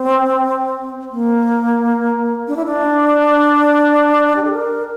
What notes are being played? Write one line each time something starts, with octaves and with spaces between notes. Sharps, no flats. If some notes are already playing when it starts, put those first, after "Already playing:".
Already playing: C4
A#3
D4
E4
D4
G4
A4
A#4